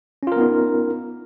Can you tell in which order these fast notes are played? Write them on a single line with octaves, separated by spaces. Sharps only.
C#4 F4 A#4 B3 D#4